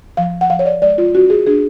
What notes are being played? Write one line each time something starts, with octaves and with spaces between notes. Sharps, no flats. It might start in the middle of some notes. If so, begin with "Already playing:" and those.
F3 F5
F#5
F3 F5
C#5
D5
G#3 D5
F4
C#4 F#4
G#4
D4 G#4